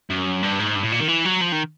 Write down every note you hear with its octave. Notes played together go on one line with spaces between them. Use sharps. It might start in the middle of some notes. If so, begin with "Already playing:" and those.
F#2
G2
G#2
G2
A2
A#2
D#3
E3
F#3
F3
D#3